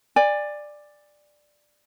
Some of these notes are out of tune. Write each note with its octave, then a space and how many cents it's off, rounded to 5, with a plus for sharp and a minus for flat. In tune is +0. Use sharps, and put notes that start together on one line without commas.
D5 +10 G#5 -30